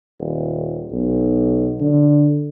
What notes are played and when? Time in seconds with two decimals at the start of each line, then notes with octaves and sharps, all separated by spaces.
0.20 D#1
0.92 B1
1.81 D3